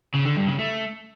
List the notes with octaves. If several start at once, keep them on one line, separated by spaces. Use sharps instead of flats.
C#3
D3
G2
C#3
A3